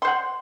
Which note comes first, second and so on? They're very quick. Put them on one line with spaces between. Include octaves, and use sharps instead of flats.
C6 C5 F#5